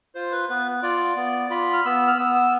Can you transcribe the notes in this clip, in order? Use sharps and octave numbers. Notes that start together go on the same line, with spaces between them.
F4 C5
B4
B3 B4
F4 D5
B3
F4 B5
F6
B3 E6
F6
B3 E6
E6